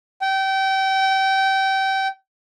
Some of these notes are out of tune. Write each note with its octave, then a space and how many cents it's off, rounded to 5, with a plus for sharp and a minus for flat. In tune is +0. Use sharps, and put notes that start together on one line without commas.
G5 -30